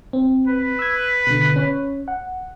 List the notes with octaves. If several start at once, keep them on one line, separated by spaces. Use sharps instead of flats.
C4
B4
E6 G#6
B2 D3
C#4 C#5
F#5